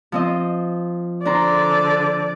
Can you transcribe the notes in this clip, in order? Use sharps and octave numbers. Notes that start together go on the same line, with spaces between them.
F3 C4 D#5
D3 D4 C5 D5 A#5